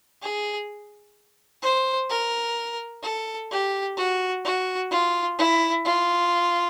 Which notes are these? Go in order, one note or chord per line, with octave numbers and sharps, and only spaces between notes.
G#4
C5
A#4
A4
G4
F#4
F#4
F4
E4
F4